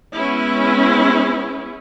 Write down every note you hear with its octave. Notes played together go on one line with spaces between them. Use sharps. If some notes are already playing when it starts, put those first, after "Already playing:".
G#3 B3 C#4 E4